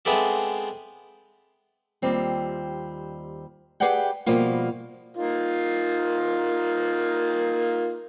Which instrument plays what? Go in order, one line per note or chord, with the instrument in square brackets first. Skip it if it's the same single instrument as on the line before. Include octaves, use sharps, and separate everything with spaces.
[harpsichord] G#3 B3 C4 A4 D5 E5
[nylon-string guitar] D#2 G3 C4 F4
G4 G#4 B4 D5 F#5 G5
B2 F3 G3 A#3 F4
[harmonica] A#3 D#4 F4